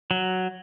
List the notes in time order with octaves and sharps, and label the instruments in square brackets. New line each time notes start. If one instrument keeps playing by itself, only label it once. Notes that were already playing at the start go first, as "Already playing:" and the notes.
[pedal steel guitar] F#3